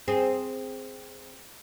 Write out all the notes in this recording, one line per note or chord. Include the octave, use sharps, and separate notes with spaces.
C4 G#4